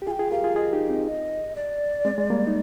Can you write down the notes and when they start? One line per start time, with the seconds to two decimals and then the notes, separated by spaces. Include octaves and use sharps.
0.02 G4
0.07 F4 G#4 G#5
0.11 G5
0.19 F4 G#4
0.31 G4 A#4 F5
0.44 F4 G#4
0.56 F4 G#4 D#5
0.73 D#4 G4
0.89 C4 D#4
1.07 D#5
1.56 D5
2.05 G#3 C4
2.18 G#3
2.30 G3 A#3
2.47 D#4